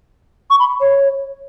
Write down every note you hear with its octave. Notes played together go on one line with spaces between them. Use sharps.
C#6
B5
C#5